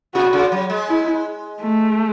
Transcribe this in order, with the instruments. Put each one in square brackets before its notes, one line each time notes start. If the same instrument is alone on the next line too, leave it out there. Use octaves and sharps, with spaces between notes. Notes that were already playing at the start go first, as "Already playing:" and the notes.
[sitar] B2 [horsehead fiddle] F#4
[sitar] C#3
F#3
G#3
[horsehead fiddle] E4
A3